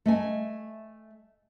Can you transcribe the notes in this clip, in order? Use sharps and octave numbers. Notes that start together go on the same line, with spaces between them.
A3 D#5 G#5